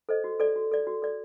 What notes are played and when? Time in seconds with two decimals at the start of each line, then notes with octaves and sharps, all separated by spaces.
0.09 A4 C5 D#5
0.24 F#4
0.40 A4 D5
0.56 F#4
0.71 A4 D5
0.87 F#4
1.02 A4 D5